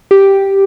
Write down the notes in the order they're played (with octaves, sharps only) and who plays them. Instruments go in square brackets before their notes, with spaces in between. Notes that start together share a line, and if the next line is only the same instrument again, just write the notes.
[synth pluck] G4